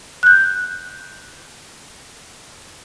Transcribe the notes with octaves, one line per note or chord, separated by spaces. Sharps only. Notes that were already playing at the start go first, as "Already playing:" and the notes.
F#6 G6